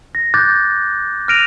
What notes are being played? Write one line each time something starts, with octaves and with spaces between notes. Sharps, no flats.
A#6
D6 F#6 G6 A6
F6 F#6 A#6 D7 D#7 F7